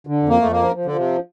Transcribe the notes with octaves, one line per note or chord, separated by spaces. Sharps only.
D3
F2
A#3
F2 A3
A#3
F3
F3
D3
F3
C3